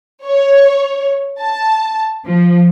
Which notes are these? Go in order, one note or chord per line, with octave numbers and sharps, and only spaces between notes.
C#5
A5
F3